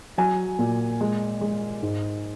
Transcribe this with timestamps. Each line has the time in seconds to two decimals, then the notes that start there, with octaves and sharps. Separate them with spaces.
0.18 F#3 G#5
0.59 A#2
1.01 G#3
1.41 G#3
1.83 G#2